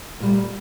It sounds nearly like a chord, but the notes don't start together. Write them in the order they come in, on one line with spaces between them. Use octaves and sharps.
A#2 G3 A3